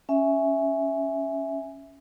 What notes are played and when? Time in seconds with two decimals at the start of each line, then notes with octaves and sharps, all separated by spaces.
0.09 C#4 E5 G#5